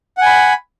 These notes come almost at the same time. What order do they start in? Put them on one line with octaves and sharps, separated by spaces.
F#5 G#5 B5